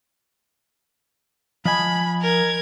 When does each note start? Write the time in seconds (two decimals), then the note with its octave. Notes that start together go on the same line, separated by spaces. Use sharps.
1.65 F3 D#5 G#5 B5
2.21 A#4 G#6